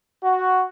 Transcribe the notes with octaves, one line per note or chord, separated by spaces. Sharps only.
F#4